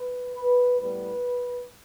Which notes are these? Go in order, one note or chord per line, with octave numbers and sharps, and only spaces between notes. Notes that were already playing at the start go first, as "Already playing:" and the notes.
Already playing: B4
B4
A2 G3 B3 B4